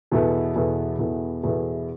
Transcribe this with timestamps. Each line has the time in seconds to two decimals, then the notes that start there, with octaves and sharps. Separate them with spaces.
0.11 E2 B2 B3 E4 A4
0.55 E2 B2 B3 E4 A4
0.99 E2 B2 B3 E4 A4
1.43 E2 B2 B3 E4 A4